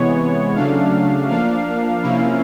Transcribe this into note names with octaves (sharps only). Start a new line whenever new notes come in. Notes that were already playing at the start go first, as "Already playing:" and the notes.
Already playing: C3 E3 G#3 B3 C#5
C#3 F#3 A3 D4 F5
F3 A#3 D4 F5
C3 F3 A#3 C#4 E4